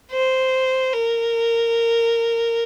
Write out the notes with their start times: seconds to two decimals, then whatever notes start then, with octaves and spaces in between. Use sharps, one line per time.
0.12 C5
0.93 A#4